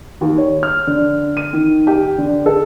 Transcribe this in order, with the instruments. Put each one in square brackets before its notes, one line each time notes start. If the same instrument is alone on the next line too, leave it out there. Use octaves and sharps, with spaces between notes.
[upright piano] D#2
C#5
F6
D3
D#7
D#3
G4
D3
A4